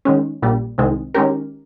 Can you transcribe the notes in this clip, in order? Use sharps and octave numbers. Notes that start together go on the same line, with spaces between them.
D#3 G#3 C#4
A#1 A#2 G3
C2 C3 D#3 G#3 C4
D#3 G#3 C#4 G4 A#4